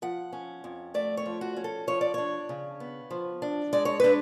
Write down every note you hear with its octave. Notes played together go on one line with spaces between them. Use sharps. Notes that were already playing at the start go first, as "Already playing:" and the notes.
F3 F#5
C#4
F2
A3 D5
C#5
F3
F#4
C#4
A4
F3 C#5
D5
D4 C#5
C#3
B3
F3
D4
G#3 D5
C#5
D4 B4